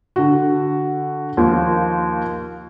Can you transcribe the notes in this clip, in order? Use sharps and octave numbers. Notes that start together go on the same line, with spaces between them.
D3 F#4
D#2 F3